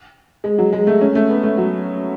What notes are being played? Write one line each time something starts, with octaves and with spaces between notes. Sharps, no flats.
G#3
F#3
G#3
A3
C#4
A3
B3
A3
F#3